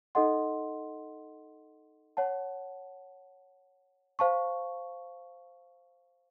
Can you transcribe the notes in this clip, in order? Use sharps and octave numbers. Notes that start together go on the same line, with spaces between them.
D#4 A4 D#5 F#5 C6
C#5 F#5 A5
C5 F5 A5 C#6